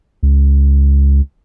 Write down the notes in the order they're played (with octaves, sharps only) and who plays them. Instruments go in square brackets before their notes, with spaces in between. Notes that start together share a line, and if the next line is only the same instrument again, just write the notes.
[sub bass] C#2